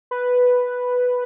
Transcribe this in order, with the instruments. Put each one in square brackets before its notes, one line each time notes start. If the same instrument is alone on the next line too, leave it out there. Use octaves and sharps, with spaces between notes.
[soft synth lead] B4